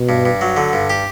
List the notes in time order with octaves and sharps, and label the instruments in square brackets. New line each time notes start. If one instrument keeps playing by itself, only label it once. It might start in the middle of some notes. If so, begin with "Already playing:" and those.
Already playing: [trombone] B2
[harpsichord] G2
G2
F#3
D3
G2
G4